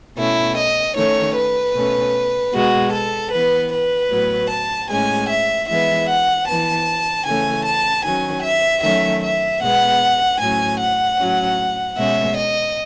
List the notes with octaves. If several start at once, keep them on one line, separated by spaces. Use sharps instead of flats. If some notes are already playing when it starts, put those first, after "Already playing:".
B2 A3 C#4 E4
D#5
D#3 A3 C#4 C#5
B4
B2 A3 C#4
B2 G#3 B3 F#4
A4
E3 B3 B4
B4
A2 F#3 B3
A5
A2 G#3 C#4 G#5
E5
E3 G#3 B3 E5
F#5
E3 B3 A5
C#3 E3 A3 C#4 G#5
A5
D#3 F#3 C#4 G#5
E5
D#3 F#3 A3 C#4 E5
E5
B2 G#3 B3 F#5
A2 F#3 C#4 G#5
F#5
A2 F#3 C#4
B2 G#3 C#4 E5
D#5